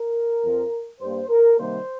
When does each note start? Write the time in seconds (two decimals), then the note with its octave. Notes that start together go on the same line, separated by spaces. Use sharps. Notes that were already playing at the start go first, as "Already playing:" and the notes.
Already playing: A#4
0.43 F2 F3 C4
1.00 G2 G3 A#3 C5
1.29 A#4
1.58 C3 D#3 G3 A#3 C5